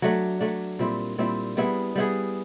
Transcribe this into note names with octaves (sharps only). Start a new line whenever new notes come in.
F#3 A3 D4
F#3 A3 D4
A#2 G3 C4 E4
A#2 G3 C4 E4
G3 B3 E4 G#4
G3 B3 E4 G#4